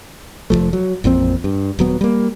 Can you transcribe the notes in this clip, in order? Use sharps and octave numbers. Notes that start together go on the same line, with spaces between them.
F1 F2 F3 A3
F#3
A1 F2 A#2 C4
G2
D#1 F#3 B3
G3 A#3